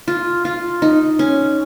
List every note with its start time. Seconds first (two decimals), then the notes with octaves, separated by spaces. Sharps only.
0.08 F4
0.45 F4
0.82 D#4
1.19 C#4